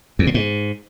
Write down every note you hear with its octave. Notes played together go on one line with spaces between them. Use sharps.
E2
A2
G#2